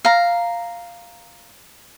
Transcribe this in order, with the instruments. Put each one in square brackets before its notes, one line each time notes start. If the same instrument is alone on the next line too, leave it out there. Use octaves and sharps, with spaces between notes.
[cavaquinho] F5 A#5